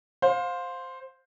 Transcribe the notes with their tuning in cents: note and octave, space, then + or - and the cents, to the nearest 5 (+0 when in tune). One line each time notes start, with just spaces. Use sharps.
C5 +0 F5 +25